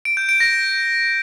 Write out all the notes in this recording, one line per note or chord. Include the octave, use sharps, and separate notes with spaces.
D7
G6
D7
A#6